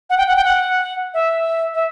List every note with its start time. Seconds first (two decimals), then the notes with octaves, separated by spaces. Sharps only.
0.10 F#5
0.18 G5
0.27 F#5
0.36 G5
0.44 F#5
1.14 E5
1.74 E5